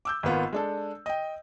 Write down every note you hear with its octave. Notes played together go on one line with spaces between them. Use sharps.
D6 E6 G6
G#1 A#3 B3 F4
G#3 D4 A4
D#5 G5